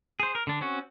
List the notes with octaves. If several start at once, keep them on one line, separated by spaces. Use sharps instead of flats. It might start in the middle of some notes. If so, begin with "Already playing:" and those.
G#4 C5
A#4
D3 D4
C4 C#4 F#4